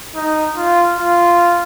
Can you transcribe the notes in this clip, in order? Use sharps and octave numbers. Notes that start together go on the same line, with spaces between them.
D#4
F4
F4